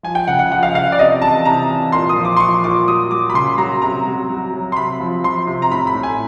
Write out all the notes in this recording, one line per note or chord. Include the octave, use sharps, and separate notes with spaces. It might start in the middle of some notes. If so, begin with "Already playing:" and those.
F3 G#5
G5
C#3 F#5
F#5
F3 F#5
F5
C#3 F5
D5
C3 D#5
E3 A5
C3 A#5
E3
A#2 C6
D#6
F3
D6
C6
F3 C#6
A#2 D6
F#3 D#6
F#3 D6
B5
C#3 C6
F#3 A#5
C3 A#5
F#3
F#3
F#3
C6
C3 B5
F3
F3 C6
C3
A#5
A2 B5
B5
A2
G#5